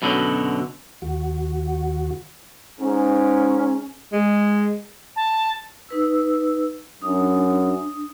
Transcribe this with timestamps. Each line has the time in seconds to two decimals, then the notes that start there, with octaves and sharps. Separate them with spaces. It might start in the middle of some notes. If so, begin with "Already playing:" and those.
0.02 F#2 B2 D3 F#3
1.02 D#2 F#4
2.80 G#2 C#4
4.12 G#3
5.16 A5
5.89 D#4 B4 E6
7.02 F#2 D4 D#6